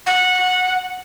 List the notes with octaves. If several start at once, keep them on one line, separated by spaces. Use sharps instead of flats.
F#5